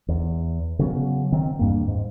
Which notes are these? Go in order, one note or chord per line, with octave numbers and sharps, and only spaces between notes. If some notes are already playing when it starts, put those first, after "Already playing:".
E2
C#3 F#3 B3
D#3 C4
E2 G2 A#3
G#2